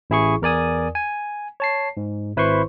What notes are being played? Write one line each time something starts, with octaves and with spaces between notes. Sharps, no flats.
A1 E4 G#4 C#6
E2 A#4 D5 G#5 D#6
G#5
C#5 A5 C7
G#2
G#1 E4 B4 C5 C6 C#6